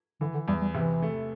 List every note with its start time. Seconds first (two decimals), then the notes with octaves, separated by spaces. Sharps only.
0.21 D3 E3
0.34 D3
0.48 E2 G3
0.61 G3
0.74 C3 E3
1.02 A3